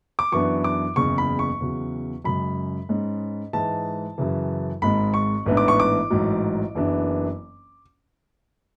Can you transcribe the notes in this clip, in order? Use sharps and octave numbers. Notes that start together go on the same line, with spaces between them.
D6
F#2 E3 B3 D4 C#6
D6
F#1 E2 C#3 C#6
B5
C#6
E2 C#3 F#3
F#2 C#3 G#3 B5
G#2 G#3 C#4
G#2 E3 G#3 A5
F#2 C#3 E3
G#1 G#2 G#3 B5
C#6
A1 G#2 E3 B3 D4
D6
C#6
D6
A1 G#2 F#3
F#1 F#2 E3 B3 D4